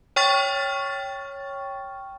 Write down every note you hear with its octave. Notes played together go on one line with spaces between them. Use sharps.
C#5 G5 C#6 F6 A6